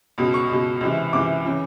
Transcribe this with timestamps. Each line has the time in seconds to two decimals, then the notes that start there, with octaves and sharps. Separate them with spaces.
0.18 C#2 B2
0.34 C#6
0.49 C#2 B2
0.81 C#2 C3 E3
1.13 C#2 C3 E3 D6
1.45 C#3 E3